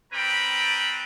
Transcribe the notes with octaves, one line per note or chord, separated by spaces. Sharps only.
G3 C4 B4 G5 A#5 B5